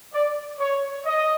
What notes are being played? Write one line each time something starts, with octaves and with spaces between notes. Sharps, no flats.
D5
C#5
D#5